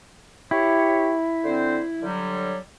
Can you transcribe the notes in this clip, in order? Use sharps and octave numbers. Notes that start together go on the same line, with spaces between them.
E4 G4 C#5
D3 C4 C5
D3 F#3 G3